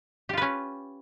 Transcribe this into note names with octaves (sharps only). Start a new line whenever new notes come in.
C#4 F4 G4 B4